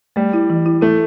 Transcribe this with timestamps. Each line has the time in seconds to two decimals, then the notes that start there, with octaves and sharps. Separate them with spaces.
0.16 G3 A3
0.33 E4
0.50 E3
0.66 E4
0.82 A3 E4